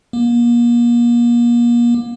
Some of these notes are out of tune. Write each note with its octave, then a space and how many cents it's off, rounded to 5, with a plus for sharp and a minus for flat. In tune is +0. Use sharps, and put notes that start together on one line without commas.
A#3 +35